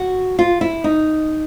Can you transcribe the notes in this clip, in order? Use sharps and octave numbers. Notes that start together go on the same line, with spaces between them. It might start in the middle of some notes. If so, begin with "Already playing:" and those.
Already playing: F#4
F4
E4
D#4